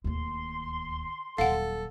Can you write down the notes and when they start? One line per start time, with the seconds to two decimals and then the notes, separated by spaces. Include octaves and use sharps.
0.04 D1 D#2 C6
1.38 D#1 F#3 A4 F5 F#5